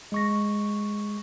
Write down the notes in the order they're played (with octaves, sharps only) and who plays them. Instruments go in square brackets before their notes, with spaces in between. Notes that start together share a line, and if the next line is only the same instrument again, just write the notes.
[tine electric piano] G#3 C#6 A#6